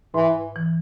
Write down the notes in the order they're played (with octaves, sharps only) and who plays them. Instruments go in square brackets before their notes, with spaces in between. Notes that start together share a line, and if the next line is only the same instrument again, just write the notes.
[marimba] G#2 [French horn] E3
[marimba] E3